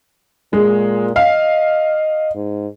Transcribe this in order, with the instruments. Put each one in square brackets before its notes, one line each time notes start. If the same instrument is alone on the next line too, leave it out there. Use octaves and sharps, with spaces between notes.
[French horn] A#2 [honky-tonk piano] G#3
[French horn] D#5 [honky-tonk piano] F5
[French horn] G#2